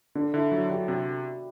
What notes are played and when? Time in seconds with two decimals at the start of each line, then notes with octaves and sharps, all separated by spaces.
0.15 D3 D4
0.33 D3 E4
0.51 F#3 F#4
0.70 D3 G4
0.88 C3 F#4